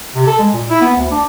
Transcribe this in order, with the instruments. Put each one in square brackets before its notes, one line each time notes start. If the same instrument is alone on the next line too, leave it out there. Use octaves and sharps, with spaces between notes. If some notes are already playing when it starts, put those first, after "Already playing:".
[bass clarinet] C3
A4
G#3
A#2
E4
B3
D2
D4